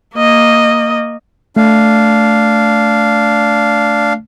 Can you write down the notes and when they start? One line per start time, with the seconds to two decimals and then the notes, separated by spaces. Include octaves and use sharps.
0.15 A#3 D#5
1.56 A3 D4 F5